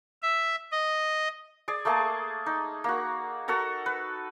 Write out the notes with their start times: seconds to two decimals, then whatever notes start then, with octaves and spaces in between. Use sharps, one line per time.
0.22 E5
0.72 D#5
1.68 G#4 D5
1.85 A3 A#3 G#4 A5
2.46 D#4
2.84 A#3 F#4
3.48 F#4 A4 A#4 A#5
3.86 B4